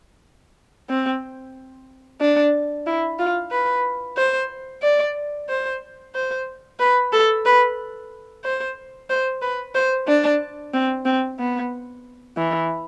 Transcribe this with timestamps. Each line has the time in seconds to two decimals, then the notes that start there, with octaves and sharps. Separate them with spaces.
0.89 C4
2.21 D4
2.86 E4
3.19 F4
3.51 B4
4.17 C5
4.83 D5
5.49 C5
6.15 C5
6.79 B4
7.13 A4
7.46 B4
8.44 C5
9.10 C5
9.42 B4
9.75 C5
10.08 D4
10.74 C4
11.05 C4
11.39 B3
12.37 E3